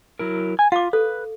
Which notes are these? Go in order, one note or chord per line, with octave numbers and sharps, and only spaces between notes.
F#3 E4 A#4
G#5
F4 F5 D6
A4 B4